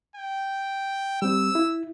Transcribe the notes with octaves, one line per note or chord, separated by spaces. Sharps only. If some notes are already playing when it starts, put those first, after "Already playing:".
G5
G3 C4 E6
E4